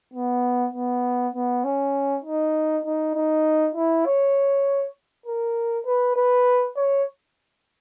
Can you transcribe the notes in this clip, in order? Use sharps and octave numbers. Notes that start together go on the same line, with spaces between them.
B3
B3
B3
C#4
D#4
D#4
D#4
E4
C#5
A#4
B4
B4
C#5